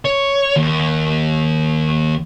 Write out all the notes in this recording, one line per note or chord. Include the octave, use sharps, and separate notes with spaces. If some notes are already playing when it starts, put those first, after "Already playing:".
C#5
D#2